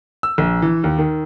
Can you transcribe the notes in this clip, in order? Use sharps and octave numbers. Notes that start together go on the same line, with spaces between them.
E6
A#1
E3
D#2
D#3